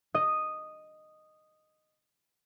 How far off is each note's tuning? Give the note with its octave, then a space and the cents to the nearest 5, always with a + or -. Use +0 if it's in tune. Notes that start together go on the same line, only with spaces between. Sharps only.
D#5 -5